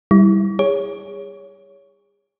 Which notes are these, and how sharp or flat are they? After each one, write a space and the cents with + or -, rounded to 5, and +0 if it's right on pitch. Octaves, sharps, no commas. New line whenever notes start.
G3 +0 E4 -10
G#4 -35 C#5 +15